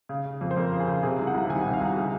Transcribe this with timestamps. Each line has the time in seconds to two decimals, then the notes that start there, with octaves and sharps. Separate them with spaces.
0.09 C#3
0.25 C#3
0.41 F2
0.51 C5
0.56 F2 A#4
0.72 C#3
0.80 G#4
0.88 C#3
1.03 C3 G#4
1.19 C2
1.27 F#5
1.34 C2
1.50 D#3 G#5
1.62 C3 F#5
1.73 F5
1.81 C2 F#5
1.91 F#4
1.97 C#3 G#4